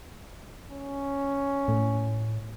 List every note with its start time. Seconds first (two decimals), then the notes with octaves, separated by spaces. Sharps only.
0.71 C#4
1.68 A2